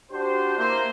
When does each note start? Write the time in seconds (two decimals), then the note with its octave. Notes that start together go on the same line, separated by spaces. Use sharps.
0.12 D4 F#4 G4 C5
0.57 A#3 E4 C5